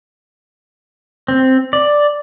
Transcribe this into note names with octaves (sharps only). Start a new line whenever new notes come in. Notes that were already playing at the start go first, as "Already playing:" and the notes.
C4
D5